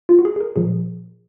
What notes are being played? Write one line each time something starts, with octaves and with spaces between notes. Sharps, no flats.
F4
F#4
G#4
G#4
A#4
A#2 F3 G#4